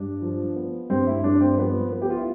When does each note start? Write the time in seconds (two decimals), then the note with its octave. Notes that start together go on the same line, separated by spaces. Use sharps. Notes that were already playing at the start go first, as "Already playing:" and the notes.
Already playing: G2 D4
0.22 F3
0.56 B3
0.90 G2 C4
1.07 E4
1.24 G2 D4
1.41 C4
1.58 F3 B3
1.92 B3
2.02 G4
2.10 F4
2.17 E4